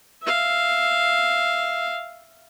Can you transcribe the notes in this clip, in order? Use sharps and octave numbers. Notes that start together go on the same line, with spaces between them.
E5 F5